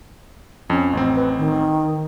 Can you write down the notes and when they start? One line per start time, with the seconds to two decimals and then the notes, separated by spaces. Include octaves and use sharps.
0.70 F2 C#4
0.93 A1 C4
1.16 B4
1.38 D#3